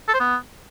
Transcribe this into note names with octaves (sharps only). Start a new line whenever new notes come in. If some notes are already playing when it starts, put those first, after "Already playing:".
A4
C5
B3